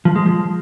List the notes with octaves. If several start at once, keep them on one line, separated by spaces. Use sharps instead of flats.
F3
G#3
F3